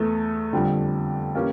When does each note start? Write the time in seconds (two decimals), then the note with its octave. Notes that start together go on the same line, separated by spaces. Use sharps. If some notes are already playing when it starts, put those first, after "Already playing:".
Already playing: E2 E3 A3
0.53 F2 D3 G3
1.35 E3 A#3 C#4 G4